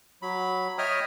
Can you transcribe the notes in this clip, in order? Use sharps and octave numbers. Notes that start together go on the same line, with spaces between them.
F#3 B5
C#5 D#5 E5 G5 D#6 F6